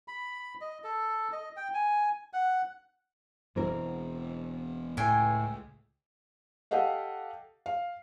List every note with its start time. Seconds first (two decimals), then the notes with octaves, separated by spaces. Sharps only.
0.08 B5
0.61 D#5
0.84 A4
1.32 D#5
1.57 G5
1.74 G#5
2.33 F#5
3.56 E1 B2 E3 C4 A#4
4.97 C#2 A2 G5 G#5
6.71 G4 A4 D#5 F5 F#5
7.66 F5